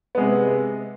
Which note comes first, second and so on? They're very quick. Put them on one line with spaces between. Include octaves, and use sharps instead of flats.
B3 G#3 C3